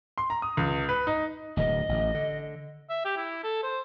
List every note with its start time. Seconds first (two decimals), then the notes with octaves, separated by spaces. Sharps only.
0.18 C6
0.30 A#5
0.42 D#6
0.57 C#2
0.89 B4
1.07 D#4
1.57 D1 D2 D#5
1.89 A1
2.14 D3
2.89 E5
3.05 G4
3.17 E4
3.44 A4
3.63 C5